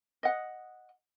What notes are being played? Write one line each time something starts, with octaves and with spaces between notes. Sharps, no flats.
D#5 F#5